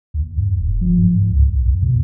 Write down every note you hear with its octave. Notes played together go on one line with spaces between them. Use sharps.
D#2
G2
E1
F3
G2
G#2
C#2
B1
F2
B2